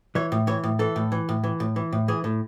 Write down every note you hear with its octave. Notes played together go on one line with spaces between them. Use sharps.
E3 C#5
A2
E3 C#5
A2
E3 A4
A2
E3
A2
E3
A2
E3
A2
E3 G#4
A2